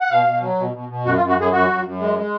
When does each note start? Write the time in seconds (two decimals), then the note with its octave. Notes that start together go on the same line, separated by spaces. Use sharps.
0.01 F#5
0.10 B2 F5
0.25 B2
0.41 F#3
0.58 B2
0.74 B2
0.89 B2
1.05 F#2 F#4
1.17 F4
1.21 F#2
1.29 F#4
1.37 F#2 G#4
1.52 F#2 F#4
1.69 F#2
1.84 F#2
2.00 G#3
2.16 G#3